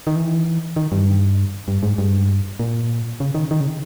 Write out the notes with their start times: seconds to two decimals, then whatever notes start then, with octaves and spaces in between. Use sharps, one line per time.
0.07 D#3
0.16 E3
0.76 D#3
0.92 G2
1.68 G2
1.83 G#2
1.98 G2
2.59 A#2
3.20 C#3
3.35 D#3
3.51 D#3
3.60 C#3